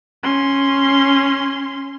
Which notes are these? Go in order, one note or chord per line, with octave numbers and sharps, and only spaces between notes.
C#4 C6